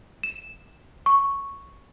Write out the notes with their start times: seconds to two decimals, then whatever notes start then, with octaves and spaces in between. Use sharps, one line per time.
0.23 E7
1.06 C#6